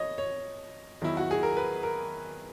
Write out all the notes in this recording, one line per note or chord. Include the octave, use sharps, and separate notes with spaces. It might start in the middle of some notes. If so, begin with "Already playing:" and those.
Already playing: C#5 D#5
C#5
E2 D#3 F#3 E4
F#4
G#4
A#4
B4
A#4